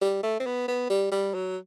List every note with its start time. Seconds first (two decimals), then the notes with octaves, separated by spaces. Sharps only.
0.01 G3
0.23 A3
0.40 C4
0.46 B3
0.68 B3
0.90 G3
1.12 G3
1.34 F#3